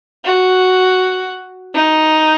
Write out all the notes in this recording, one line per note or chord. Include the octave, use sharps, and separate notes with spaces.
F#4
D#4